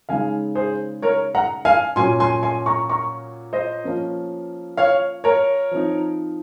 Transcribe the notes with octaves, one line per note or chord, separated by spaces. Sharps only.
C#3 G#3 D#4 F5 G#5
G#4 C5
A#4 C#5
F#5 A#5
F5 G#5
A#2 F#3 C#4 G#5 C6
G#5 C6
G#5 C6
A#5 C#6
A#5 C#6
C5 D#5
F3 A#3 C#4
C#5 F5
A#4 C#5
F3 C4 D#4